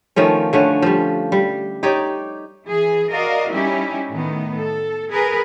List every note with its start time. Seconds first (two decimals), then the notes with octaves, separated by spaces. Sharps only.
0.16 D#3 F3 A3 C#4
0.53 D3 A3 C#4
0.82 F3 G3
1.32 G3
1.83 D#4 G4 C#5 D5
2.65 E3 G#4
3.11 F#4 A#4 D5 D#5 F5
3.52 G3 C#4 D#4 E4 G4
4.09 A2 D#3 B3
4.55 A4
5.10 G#4 A#4 B4